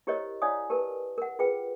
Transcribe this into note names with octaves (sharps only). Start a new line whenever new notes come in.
E4 G4 A#4 C5 C#5 D#5
E4 C#5 D5 F5 G#5 D#6
G4 A#4 B4 A5
A#4 F#5
F4 G#4 B4 G5